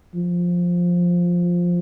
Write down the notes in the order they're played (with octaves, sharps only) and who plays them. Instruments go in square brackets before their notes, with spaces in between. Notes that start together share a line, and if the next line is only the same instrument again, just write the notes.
[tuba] F3